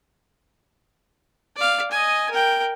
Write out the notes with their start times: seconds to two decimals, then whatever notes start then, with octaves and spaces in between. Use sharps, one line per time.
1.56 D5 F5
1.91 D#5 G#5
2.31 A#4 G5